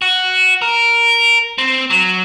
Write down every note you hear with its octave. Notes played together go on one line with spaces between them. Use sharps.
F#4
A#4
C4
F#3